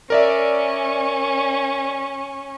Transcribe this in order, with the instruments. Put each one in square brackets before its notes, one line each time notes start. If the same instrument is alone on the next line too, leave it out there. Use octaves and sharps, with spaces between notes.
[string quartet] C#4 [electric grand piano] A#4 D5 E5